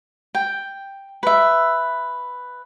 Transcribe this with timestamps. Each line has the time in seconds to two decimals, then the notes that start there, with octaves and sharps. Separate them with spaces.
0.35 G5
1.23 B4 E5